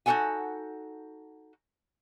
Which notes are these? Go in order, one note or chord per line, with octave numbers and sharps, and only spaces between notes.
D#4 F#4 G#4 A4 F#5 G#5